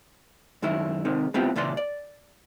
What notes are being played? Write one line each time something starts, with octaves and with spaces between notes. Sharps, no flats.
F#2 D#3 G#3 E4
C3 D#3 G#3
G#3 B3 C4 E4 F4 G4
C#2 A#2 E3 D5 C6
D5